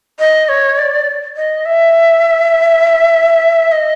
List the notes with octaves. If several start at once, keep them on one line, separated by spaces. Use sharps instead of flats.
D#5
C#5
D5
D#5
E5
D#5